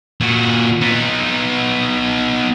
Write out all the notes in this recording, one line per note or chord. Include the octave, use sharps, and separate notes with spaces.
A#2 F#4
B3 D#4